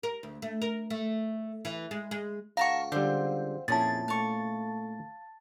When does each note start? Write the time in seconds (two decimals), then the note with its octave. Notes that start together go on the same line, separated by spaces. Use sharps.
0.03 A#4
0.23 D2
0.42 A3
0.62 A#4
0.90 A3
1.65 E3
1.91 G#3
2.11 G#3
2.57 C#2 A#4 F5 F#5 A5 C#6
2.92 D3 G3 C4 C5
3.68 F2 A#2 C#4 E4 G#4 A5 A6
4.08 A3 F5 C#6